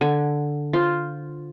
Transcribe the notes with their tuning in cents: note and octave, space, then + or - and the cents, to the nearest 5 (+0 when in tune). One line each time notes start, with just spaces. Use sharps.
D3 +0 G#5 +0
F4 +0 C5 +0